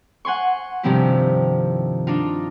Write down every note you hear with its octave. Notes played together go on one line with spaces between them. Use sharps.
F#5 G#5 C6 C#6
G2 C3 D#3 F3 C4 E4
D4 D#4 F4